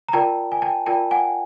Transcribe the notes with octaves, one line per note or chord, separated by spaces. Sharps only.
A#5
F4 A#4 D5 G5 A5
G#5
G5 A5
F4 A#4 D5 G5 A5
F#5 G#5